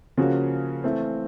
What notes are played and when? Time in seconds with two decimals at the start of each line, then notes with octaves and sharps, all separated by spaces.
0.18 C#3 F3 A#3 C#4 F#4
0.84 E3 A3 C4